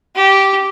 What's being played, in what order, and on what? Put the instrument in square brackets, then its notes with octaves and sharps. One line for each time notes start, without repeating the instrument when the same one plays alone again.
[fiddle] G4